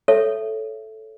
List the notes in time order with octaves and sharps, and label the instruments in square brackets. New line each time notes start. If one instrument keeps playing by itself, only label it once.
[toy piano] A4 C#5 E5